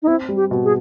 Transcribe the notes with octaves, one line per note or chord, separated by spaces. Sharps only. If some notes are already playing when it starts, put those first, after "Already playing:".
D#4
C4 E4
G3
G4
B2
G#4